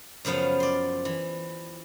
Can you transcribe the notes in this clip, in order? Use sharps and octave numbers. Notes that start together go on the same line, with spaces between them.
F#2 C#3 F3 B3 F5
D5 C6
E3